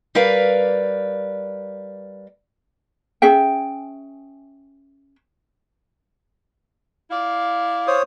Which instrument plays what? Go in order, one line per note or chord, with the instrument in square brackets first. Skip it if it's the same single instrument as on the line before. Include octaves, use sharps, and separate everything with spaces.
[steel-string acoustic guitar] G3 A#4 B4 D5 F5
[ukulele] C#4 G#4 E5 G5
[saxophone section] E4 D5 F5
[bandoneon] C5 C#5 D#6